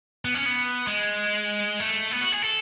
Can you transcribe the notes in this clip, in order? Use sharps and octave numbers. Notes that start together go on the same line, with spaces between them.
B3
C#4
B3
G#3
A3
B3
F#4
G#4
A4